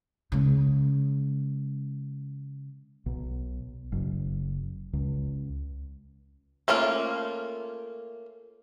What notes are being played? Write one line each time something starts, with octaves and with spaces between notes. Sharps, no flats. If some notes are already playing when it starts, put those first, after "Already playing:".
C#3 G#3
B1
F#1
C#2
A3 A#3 C#4 F4